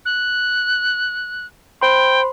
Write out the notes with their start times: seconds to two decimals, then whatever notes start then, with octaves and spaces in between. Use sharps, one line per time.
0.05 F#6
1.81 C5 G5 B5 C6